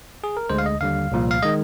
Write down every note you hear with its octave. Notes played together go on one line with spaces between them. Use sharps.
G#4
A#4
D2 D3 G#3 C5
F5
D#5
D#2 D3 G3 F5
C2 A#2 F3
F5
D#3 G#3 D#5